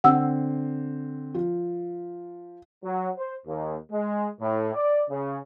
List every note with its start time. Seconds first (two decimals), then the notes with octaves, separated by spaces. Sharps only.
0.04 D3 C4 F#5 E6
1.34 F3
2.84 F#3
3.16 C5
3.47 D#2
3.91 G#3
4.41 A2
4.74 D5
5.09 C#3